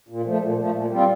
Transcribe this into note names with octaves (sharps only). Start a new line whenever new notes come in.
A#2
F3 A3
A#2
F3 A3
A#2
G3 C4 F4